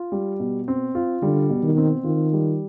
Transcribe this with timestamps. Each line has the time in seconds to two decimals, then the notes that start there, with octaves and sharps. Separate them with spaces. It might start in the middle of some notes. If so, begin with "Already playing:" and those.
Already playing: F4
0.12 G3
0.40 B2
0.68 C4
0.95 F4
1.22 D3 G3
1.49 B2
1.63 D#3
1.77 C4
2.04 D#3 F4
2.33 G3